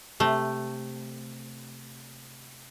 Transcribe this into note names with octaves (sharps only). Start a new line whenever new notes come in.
C3 A3